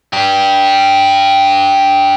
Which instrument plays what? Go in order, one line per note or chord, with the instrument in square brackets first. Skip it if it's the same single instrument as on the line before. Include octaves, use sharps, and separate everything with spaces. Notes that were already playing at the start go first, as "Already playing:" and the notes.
[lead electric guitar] D4 G4